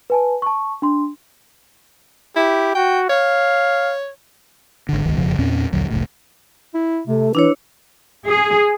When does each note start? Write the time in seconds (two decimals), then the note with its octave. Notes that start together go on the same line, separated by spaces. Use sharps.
0.10 B4 G#5 A5
0.42 A5 C#6
0.82 D4 C6
2.36 E4 G4
2.75 F#4 G5
3.10 C#5 F5
4.89 G#1 D3
5.06 G1 C#2 D#3
5.17 E1 F2 C#3 F3
5.39 E2 A#2 C4 C#4
5.72 A#1 D#2 D3 F#3
5.91 F#1 C#2 A2
6.74 E4
7.07 C3 A3
7.35 E3 D4 E4 B4 C#5
8.27 G#4